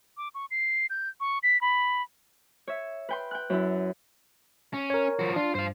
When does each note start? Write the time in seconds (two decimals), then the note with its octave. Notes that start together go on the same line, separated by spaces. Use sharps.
0.17 D6
0.35 C#6
0.51 C7
0.90 G6
1.20 C#6
1.43 B6
1.61 B5
2.67 C#5 E5
3.09 B4 G5 C6
3.31 G5 F#6
3.50 F#2 E4
4.74 C#4
4.90 A#4 C#5
5.19 F3 F#4
5.36 D4 F4
5.55 G2 C5 F5